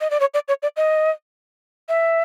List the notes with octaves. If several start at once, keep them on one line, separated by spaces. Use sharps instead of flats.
D#5
D5
C#5
D5
C#5
D5
D#5
E5